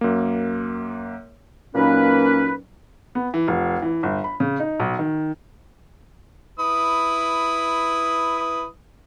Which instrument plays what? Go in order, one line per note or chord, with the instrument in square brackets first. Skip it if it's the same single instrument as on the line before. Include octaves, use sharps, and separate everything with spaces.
[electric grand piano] F#2 A#3
[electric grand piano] A#2 F#3 D#4 [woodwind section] A#3 C#4 B4
[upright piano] B3
E3
F1
E3
G1
B5
C#3
D#4
B1
D#3
[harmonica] E4 B4 D#6